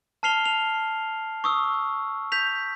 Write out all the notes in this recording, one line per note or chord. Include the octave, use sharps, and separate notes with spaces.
A5 F6 C7 F7 G7
F7
C#6 D#6 E6
G6 B6 F7